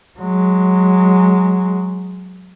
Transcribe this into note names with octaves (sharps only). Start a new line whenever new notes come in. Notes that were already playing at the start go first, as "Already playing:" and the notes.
F#3 G#3